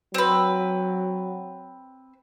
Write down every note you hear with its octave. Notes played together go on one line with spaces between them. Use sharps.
F#3 C4 B4